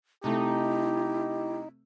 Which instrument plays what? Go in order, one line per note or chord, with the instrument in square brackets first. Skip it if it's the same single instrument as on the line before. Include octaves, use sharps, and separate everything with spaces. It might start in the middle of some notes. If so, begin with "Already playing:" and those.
[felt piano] C3 A3 [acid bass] D#4 [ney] E4 [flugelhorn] G4